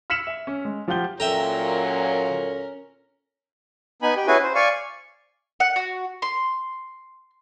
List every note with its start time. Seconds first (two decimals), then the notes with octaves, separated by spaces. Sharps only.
0.10 E6 F6 B6 C#7 E7 F#7
0.27 E5
0.47 C#4
0.65 G#3
0.88 F3 F4 G4 F#5 G6 G7
1.20 A#2 F#3 C#4 A4 A#4 E5 G5 A#5
4.02 B3 D#4 G#5 B5
4.16 G4
4.27 C#4 E4 F#4 G#4 B4 G#5
4.43 C5
4.55 D5 F5 G#5 C#6
5.60 F#5
5.76 F#4
6.22 C6